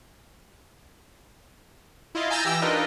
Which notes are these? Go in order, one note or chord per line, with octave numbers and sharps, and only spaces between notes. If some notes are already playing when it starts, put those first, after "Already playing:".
E4 F4 D#5 F5
G#5 A#5 E6 G6 A6 A#6
E3 G4 G5 E6 A#6
D4 D#4 F4 A#4 B4 D#5